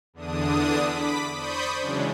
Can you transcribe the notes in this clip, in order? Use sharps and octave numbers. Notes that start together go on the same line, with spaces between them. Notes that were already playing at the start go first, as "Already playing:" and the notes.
E2 D3 D4 D#6
B5 D6 B6
C5 D5 B5 C#6 D#6 G6
C#3 E3 F#3 G#3 C#4 D4